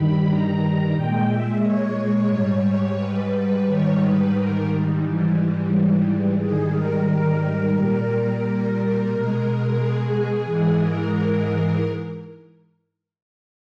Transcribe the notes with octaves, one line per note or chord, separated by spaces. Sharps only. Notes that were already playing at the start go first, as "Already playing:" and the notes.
Already playing: G2 D#3 G3 B5
A#5
A#2 G#3 G5
E5
C#5
G#2 G3
B4
B4
G#2 D#3 G3 C#5
B4
A#4
G#2 E3 G3
G#2 D#3 G3 G#4
A#4
A#4
A#2 G3
B2 G#3
G#4
G#2 E3 G#3 G#4
A#4